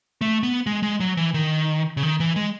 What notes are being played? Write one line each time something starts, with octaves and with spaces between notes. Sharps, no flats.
A3
B3
G#3
G#3
F#3
E3
D#3
C#3
D#3
E3
G#3